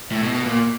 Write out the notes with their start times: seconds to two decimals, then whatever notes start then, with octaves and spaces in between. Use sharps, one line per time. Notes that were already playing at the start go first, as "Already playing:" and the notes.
0.12 A2
0.23 B2
0.34 B2
0.45 A#2